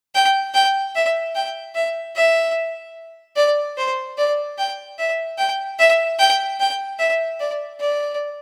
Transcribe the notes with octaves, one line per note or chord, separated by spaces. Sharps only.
G5
G5
E5
G5
E5
E5
D5
C5
D5
G5
E5
G5
E5
G5
G5
E5
D5
D5